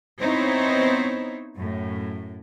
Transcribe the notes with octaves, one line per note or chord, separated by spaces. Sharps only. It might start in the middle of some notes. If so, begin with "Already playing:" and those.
B3 C4 D#4 E4 C5 C#5
F#2 A2